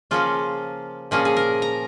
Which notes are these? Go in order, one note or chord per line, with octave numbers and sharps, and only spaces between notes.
C#3 F3 A#3 C#4 F4
A#2 F3 A#3 C#4 G#4
G#4
A#4
A#5